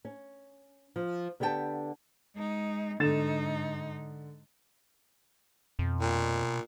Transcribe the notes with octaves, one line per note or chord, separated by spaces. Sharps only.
C#4
F3
D3 B3 G4 B4 G5 A5
G#3 D#4
G#2 D3 D#4 A6 E7
F2 B2
A#2